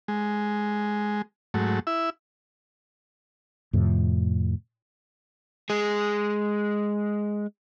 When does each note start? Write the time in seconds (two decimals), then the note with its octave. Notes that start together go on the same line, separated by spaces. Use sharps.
0.08 G#3
1.54 G#2 F#3 A3
1.87 E4 E5
3.73 F2 A2 C3
5.70 G#3 G#4